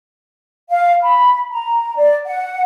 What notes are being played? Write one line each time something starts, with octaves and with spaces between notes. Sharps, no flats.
F5
B5
A#5
D5
F#5